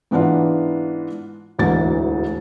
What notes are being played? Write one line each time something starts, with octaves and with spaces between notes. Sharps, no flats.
G#2 E3 B3 D4 F4
E1 D2 G#2 E3 A6